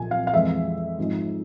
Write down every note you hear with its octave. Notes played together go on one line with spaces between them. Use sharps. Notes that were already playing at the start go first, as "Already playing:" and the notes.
Already playing: C2 A#2 F3 G#5
F5
F5
F2 E3 G#3 E5
G#1 G#2 F3 G#3